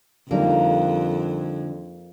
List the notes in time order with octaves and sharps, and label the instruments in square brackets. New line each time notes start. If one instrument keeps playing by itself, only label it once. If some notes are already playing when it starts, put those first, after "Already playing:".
[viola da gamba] F2 [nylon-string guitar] D3 G3 D#4 [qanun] A#3